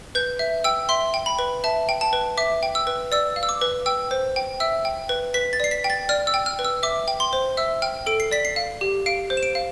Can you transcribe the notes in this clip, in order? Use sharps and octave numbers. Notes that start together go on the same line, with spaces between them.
B4 G6
E5
G5 E6
E5 C6
G5
B5
B4
E5 A5
G5
A5
B4
E5 D6
G5
E6
B4
D5 E6
F5
E6
D6
B4
G5 E6
C5
G5
E5 E6
G5
B4
B4 B6
A6
D5 C7
B6
G5
A6
D5 F6
E6
G5
F6
B4
E6
E5 D6
G5
C6
C5
E5 E6
G5 F6
A4 D7
C7
D5 B6
C7
F5
G4
F5 D7
C5
E7
D7
F5